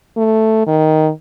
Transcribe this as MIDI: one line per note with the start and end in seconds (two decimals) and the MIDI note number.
0.17 0.64 57
0.67 1.10 51